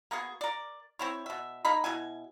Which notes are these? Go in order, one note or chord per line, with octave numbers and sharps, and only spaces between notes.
A#3 B3 F#4 G#4
A#4 D5
C4 E4 C#5
B2 E5
A#3 D#4 D#5 B5
B2 E4 G#5